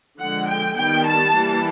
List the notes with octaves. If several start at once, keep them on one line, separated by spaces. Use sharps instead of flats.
D3 F3 G#3 F#5
G5
D#3 G3 B3 G5
A5
E3 G3 A#3